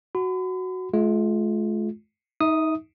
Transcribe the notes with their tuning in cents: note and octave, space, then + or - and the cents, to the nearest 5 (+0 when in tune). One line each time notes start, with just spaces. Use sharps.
F#4 +0 B5 +45
G#3 +45 F4 +0
D#4 +20 E5 -25 D#6 +0